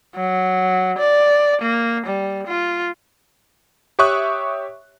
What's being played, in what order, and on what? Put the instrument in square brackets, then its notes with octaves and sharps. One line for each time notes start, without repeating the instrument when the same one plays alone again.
[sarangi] F#3
D5
A#3
G3
F4
[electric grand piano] G4 C#5 E5 C#6 D#6 F#6